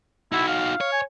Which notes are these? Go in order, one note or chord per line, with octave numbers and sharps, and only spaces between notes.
D#4 E4 F#4
F5
C#5
G#5